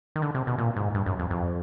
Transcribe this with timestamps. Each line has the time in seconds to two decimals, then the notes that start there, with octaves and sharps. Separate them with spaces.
0.16 D#3
0.22 D3
0.34 C3
0.47 B2
0.58 A#2
0.76 G#2
0.95 G2
1.06 F#2
1.19 F2
1.30 F2